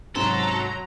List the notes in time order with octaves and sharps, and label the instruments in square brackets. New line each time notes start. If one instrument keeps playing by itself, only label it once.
[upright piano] G#2 C3 C#4 [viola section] F#3 A#5 [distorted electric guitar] A4 [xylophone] A5 C6